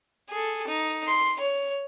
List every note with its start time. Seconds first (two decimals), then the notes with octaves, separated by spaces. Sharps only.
0.30 G#4 A4
0.67 D#4
1.07 C6
1.40 C#5